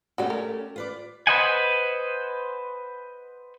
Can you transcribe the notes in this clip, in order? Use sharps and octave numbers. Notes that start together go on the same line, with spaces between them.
A3 C#4 F#4 G4 D5
A#4
F4 B4 D5
B4 C5 D#5 F#5 G#5